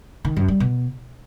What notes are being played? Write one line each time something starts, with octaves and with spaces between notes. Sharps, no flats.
D#3
F#2
G3
B2